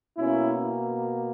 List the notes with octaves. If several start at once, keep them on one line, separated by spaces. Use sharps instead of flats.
B2 A#3 C#4 E4